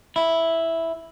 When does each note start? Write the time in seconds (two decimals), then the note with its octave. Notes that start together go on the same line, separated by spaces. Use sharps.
0.16 E4